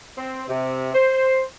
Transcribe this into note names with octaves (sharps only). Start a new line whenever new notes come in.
C4
C3
C5